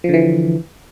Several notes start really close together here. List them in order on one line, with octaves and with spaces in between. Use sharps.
F3 D3 E3